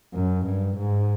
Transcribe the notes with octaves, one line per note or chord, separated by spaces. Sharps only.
F#2
G2
G#2